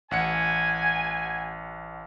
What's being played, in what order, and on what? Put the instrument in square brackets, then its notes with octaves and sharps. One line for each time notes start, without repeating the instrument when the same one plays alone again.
[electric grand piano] A1 F#5 C#7 [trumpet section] G#5